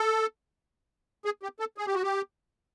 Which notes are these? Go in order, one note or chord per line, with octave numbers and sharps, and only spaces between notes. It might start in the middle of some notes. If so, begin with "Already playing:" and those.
Already playing: A4
G#4
G4
A4
G#4
G4
F#4
G4